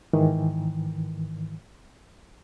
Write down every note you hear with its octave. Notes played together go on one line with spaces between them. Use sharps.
G#2 D#3 E3